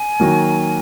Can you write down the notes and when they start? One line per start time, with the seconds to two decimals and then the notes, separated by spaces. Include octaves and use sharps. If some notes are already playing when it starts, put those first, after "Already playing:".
Already playing: G#5
0.20 D#3 F#3 A#3